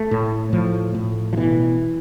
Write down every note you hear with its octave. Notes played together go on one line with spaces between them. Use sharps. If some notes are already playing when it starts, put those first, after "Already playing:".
Already playing: A3
A2
A2 F3
A2
F3
B2 E3